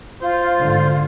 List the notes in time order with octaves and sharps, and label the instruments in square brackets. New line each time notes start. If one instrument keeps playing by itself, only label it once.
[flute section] F4 [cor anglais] C5
[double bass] G#2 D3